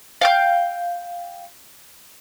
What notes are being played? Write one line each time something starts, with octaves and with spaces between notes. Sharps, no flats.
F5 G5 G6